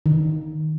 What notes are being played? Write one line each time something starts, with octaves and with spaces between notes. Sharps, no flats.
D#3